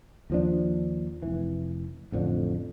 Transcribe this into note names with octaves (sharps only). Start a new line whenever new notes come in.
D#2 F3 D4
F1 E3
A1 F2 D3